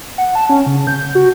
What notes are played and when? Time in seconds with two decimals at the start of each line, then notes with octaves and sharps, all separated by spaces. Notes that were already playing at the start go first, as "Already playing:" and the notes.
0.18 F#5
0.35 A5
0.49 C#4
0.66 C#3
0.87 G6
1.15 F#4